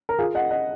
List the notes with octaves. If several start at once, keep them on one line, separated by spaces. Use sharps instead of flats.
A#4
F4 G#4
D#5 F#5
D#5 F#5